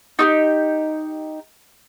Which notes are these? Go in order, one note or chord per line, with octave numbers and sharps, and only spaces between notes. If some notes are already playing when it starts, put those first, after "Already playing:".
D#4 F#4 G4